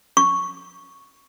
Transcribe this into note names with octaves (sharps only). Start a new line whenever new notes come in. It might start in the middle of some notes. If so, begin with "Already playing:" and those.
C#6